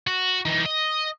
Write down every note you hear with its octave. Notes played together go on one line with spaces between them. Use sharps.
F#4
E3 D#4
D#5